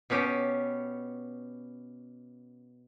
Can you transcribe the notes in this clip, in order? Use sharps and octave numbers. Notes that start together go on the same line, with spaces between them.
B2 B3 C#4 G4